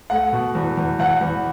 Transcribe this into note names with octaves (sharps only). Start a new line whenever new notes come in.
A3 F#5
B2
E2
E2
E2 F#5
E2